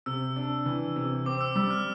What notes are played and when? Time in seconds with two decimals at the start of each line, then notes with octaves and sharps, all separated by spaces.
0.06 C3 E6
0.36 D4
0.66 E3
0.96 C3
1.26 C4 D6
1.41 E6
1.56 G3 E6
1.70 F6